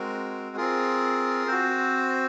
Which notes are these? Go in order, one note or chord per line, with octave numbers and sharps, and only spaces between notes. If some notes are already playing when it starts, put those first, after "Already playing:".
Already playing: G#3 C4 F#4 A#4
C4 F4 G#4 A#4
C4 F#4 C5